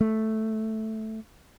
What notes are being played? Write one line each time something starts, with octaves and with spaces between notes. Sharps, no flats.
A3